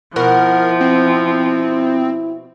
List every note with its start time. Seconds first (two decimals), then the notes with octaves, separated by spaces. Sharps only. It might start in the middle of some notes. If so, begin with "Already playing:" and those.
0.16 B2 F3 E4 A#4 F#5
0.81 C4